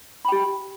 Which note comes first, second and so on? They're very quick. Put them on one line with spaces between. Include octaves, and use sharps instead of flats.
B5 G5 G4